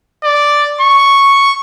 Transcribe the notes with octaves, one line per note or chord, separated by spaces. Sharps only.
D5
C#6